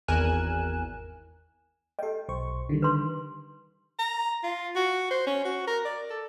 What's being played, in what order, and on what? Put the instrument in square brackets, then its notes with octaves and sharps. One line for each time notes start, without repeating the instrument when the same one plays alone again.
[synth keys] G#1 E2 A#4 G#5 F#6 E7
[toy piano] G4 D#5 [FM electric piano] A4 G5
[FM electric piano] B1 C5 C#6
D3 D#3 G3
[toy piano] B4 C6
[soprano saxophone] A#5
F4
F#4
C5
C#4
F#4
A#4
D5
A4